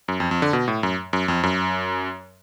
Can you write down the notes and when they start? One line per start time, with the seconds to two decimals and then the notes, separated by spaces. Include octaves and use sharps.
0.08 F#2
0.20 F2
0.31 F2
0.42 D3
0.53 B2
0.68 A2
0.83 F#2
1.13 F#2
1.28 F2
1.43 F#2